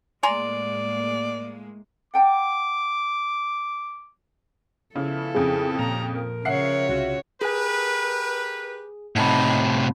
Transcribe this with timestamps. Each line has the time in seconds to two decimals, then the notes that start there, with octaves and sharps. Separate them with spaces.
0.23 A2 G#3 A#3 D5 G#5 A#5 C6
2.14 F#5 G5 A5 D6
4.96 C#3 F3 B3 E4 A4
5.35 F2 C#3 G#4
5.79 A#2 G4 A#5
6.15 F3 A#4
6.45 C#3 C#5 E5 F#5 C7
6.89 C2 F4 F#4
7.41 G4 G#4 A#4 B4 G#5
9.16 A2 C3 D#4 F#5 A5 B5